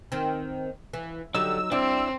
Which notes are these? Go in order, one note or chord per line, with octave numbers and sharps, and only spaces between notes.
D#3 C4
E3
D3 F#3 G3 D#4 E6
G3 C4 D4 E4 D5